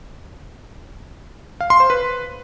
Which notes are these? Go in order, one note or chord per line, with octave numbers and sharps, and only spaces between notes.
F5
C6
C5
B4